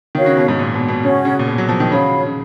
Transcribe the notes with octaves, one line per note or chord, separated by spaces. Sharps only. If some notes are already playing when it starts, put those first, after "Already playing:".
D#3 F#4 A#4 C#5 F5
C#3
B2
G#2
A#2
B2
B2
C#3 C#4 F#4 C#5
C#3
A#2
B2
F#3
F3
D#3
C#3 F#4 C#5 F5 B5
C#3